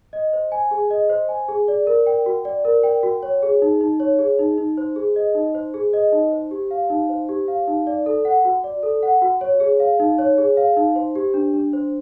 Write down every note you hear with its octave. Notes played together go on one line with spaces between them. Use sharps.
D#5
C5
G#5
G#4
D#5
C5
G#5
G#4
D5
A#4
G5
F#4
D5
A#4
G5
F#4
C#5
G#4
D#4
D#4
C#5
G#4
D#4
D#4
C5
G#4
D#5
D#4
C5
G#4
D#5
D#4
C5
G4
F5
D#4
C5
G4
F5
D#4
D5
A4
F#5
F#4
D5
A4
F#5
F#4
C#5
G#4
F5
D#4
C#5
G#4
F5
D#4
C5
G4
D4
D4
C5